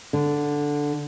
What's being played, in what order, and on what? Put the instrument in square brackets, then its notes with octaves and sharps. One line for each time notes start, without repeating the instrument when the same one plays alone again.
[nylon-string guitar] D3